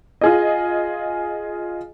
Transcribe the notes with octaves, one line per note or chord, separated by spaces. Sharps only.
F4 G#4 D#5